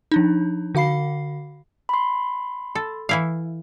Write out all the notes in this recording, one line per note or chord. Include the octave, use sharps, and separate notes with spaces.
F3 D4 D#4
D3 F#4 F5 B5 C7
B5 C6
A4
E3 E4 F5